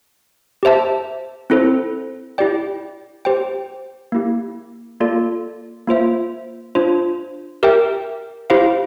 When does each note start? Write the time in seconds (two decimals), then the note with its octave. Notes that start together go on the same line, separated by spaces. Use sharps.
0.63 G4 C5 E5 A5
1.50 C4 E4 A4 C5
2.38 E4 G4 D5 G5
3.25 G4 C5 G5
4.12 A#3 E4 G4
5.00 A#3 F4 A4 D5
5.87 A#3 F4 C5 E5
6.75 D4 F4 C5
7.63 G4 A#4 E5 G5
8.50 E4 G4 C5 F5